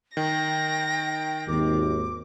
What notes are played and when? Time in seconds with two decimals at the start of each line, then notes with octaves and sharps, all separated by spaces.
0.17 D#3 G5 A#6
1.48 G#1 D#2 D6